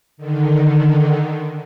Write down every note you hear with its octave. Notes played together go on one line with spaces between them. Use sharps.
D3 D#3